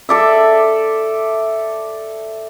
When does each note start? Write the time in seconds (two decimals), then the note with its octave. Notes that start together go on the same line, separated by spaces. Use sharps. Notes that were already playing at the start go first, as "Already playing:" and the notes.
0.09 A4 D5 E5